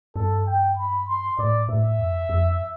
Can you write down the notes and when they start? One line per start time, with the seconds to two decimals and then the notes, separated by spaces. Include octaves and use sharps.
0.16 G2 A4
0.46 G5
0.77 B5
1.08 C6
1.38 A2 D5
1.69 A2 E5
1.99 F2
2.29 F2